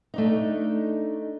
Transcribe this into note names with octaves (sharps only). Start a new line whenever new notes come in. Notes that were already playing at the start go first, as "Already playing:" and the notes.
A3 D4 D#4